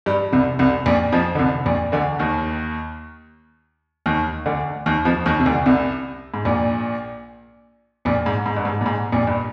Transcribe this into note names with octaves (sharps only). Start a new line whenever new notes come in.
G2 G3
C2 C3
C2 C3
A#1 A#2
F2 F3
D3
C2 C3
A#1 A#2
D2 D3
D#2 D#3
D#2 D#3
D2 D3
D#2 D#3
F2 F3
D#2 D#3
C3
D2 D3
C2 C3
G#2
A#1 A#2
A#1 A#2
G#2
G#2
G2
G#2
A#2
G#2
A#1 A#2
G2